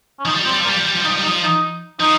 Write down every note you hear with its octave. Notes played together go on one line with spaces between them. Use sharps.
C#4
F3 D#4
G3
F3 C4
G3
F3
A#3
G3
F3
G3
F3
G3 D#4
F3
G3
D#4
F3
D#4
F3 D#4